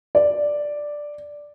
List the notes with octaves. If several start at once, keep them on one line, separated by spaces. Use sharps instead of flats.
D5